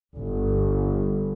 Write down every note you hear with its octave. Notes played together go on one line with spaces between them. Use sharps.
G1